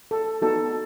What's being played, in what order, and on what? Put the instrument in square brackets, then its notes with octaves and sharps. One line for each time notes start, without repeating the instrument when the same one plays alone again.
[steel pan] A4
B3 D#4 F#4 A4